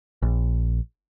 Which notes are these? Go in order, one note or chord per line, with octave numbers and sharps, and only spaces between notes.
A#1